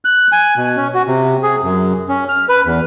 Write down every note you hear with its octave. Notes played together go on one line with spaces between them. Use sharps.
F#6
G#5
B2
C#4
F#4
C3
G#4
F#2
C#4
F6
B4
E2